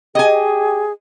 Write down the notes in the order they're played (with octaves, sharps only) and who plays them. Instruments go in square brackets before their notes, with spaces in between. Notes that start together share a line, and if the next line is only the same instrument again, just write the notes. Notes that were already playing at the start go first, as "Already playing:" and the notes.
[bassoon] G4 [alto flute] G#4 [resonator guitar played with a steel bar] D#5 G#5